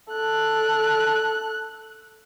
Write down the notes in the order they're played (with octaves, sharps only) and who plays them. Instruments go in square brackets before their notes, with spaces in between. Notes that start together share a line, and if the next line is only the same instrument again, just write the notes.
[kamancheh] A4 F#6